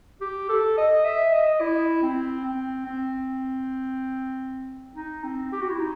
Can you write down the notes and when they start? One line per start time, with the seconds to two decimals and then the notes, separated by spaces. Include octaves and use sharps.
0.21 G4
0.49 A4
0.78 D#5
1.04 E5
1.33 D#5
1.61 E4
2.02 C4
2.45 C4
2.86 C4
4.96 D#4
5.24 C4
5.52 G4
5.61 F#4
5.70 E4
5.79 D#4